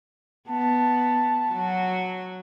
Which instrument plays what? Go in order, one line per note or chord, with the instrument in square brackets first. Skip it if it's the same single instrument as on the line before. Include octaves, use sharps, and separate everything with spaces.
[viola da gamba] B3 [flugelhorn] A5
[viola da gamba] F#3 F#4